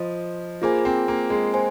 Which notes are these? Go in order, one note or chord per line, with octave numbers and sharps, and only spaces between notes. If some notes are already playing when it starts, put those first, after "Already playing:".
Already playing: F3 F4 C5 D#5
A#3 F4 G#4 C5 G#5
C4
A#3
G#3
C5 G#5